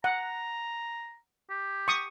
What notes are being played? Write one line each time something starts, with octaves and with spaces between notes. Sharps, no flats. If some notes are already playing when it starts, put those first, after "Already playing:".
F#5 A#5
G4
C#6 D#6